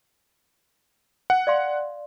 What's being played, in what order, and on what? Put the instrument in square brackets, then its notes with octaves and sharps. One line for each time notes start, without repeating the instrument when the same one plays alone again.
[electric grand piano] F#5
[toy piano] D5 F5 C6